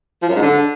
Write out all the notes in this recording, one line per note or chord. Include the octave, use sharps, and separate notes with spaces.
F3
F#2
G#2
D3